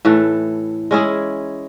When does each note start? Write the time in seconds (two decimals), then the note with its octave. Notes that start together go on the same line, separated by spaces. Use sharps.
0.05 A2 E3 A3
0.91 G#3 C#4 E4 G#4